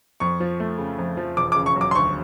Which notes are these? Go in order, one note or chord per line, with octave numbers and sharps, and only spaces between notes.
F2 C#6
F3
A3
C#3
F2
F3
E1 D6
D6
C#3
C#6
F#3
D6
C6
D2 C#6